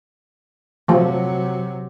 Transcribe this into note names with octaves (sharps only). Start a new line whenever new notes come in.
C3 F3 F#3 A3